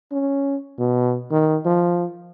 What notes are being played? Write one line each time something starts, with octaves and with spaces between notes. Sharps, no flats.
C#4
B2
D#3
F3